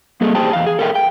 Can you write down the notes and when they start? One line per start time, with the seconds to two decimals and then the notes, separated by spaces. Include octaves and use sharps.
0.21 G3 A#3 G#4 A4
0.35 G4 G#4 C5 G5 A5
0.53 E2 F5
0.66 G#4
0.79 A4 A#4 E5 F5 G5
0.95 G5